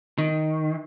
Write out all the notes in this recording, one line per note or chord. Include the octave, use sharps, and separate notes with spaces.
D#3